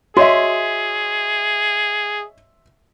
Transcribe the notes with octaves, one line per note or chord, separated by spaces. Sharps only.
F#4 G#4 C#5 D#5 E5 C6